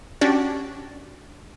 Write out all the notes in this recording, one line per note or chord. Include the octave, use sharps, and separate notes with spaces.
C#4 D4 F#4 G4 D5